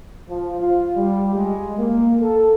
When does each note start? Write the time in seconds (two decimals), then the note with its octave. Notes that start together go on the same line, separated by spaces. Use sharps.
0.29 F3
0.60 F4
0.97 G3
1.35 G#3
1.78 A#3
2.21 A4